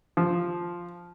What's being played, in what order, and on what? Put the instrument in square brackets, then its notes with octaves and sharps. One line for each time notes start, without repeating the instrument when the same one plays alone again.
[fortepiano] F3